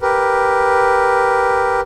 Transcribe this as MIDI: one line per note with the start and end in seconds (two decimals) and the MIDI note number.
0.01 1.81 67
0.01 1.81 70
0.01 1.81 71